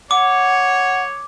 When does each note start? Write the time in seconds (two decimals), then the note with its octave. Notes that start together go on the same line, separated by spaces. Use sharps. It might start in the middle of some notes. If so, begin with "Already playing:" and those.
0.11 C#5 F#5 D6